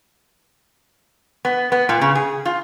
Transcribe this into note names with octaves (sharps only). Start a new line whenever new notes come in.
B3
B3
A#2
C#3
G#4
F4